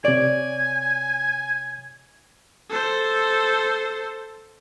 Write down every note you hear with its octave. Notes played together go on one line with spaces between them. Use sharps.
C3 C#5 D5 G#5
A4 C5